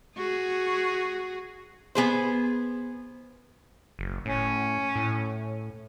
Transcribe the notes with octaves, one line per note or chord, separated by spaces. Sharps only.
F#4 G#4
B3 G#4 C5
F#1
A2 C#4
A2